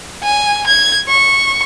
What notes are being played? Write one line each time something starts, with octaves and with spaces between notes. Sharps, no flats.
G#5
G#6
C#6